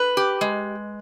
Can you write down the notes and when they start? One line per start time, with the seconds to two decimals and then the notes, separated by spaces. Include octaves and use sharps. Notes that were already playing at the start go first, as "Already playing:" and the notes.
Already playing: B4
0.17 G4
0.41 G#3